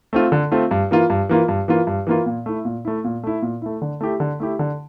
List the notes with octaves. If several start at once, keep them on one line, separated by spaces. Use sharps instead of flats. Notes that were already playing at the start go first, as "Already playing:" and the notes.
A3 C4 F4
D3
A3 C4 F4
G2
E3 A#3 F4
G2
E3 A#3 F4
G2
E3 A#3 F4
G2
E3 A#3 F4
A#2
A3 E4
A#2
A3 E4
A#2
A3 E4
A#2
A3 E4
D3
A3 E4 G4
D3
A3 E4 G4
D3